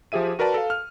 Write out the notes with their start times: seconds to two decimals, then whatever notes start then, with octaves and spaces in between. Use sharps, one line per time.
0.12 F3 G4 G#4 E5 D#7
0.39 F#4 A#4 B4 D5 A5
0.54 A4 F5
0.70 F6